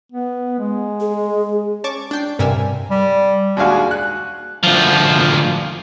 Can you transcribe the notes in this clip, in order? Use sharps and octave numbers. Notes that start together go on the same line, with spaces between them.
B3
G#3
G#4
C#4 A5 C#6 D6
D4 G5 C7
G2 C3 A#4 G#5 E6
G3
D#2 G#3 D4 F#4 F5 G#5
F#6
D2 F3